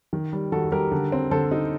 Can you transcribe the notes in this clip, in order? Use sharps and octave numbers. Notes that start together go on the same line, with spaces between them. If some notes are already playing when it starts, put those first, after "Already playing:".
D#3
G3
D#3 F#4 A4
G3 G4 A#4
D3
C4
D3 A4 C5
D#4